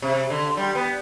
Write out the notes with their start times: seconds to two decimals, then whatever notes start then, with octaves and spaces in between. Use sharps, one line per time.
0.02 C3
0.30 D3
0.57 G3
0.75 B3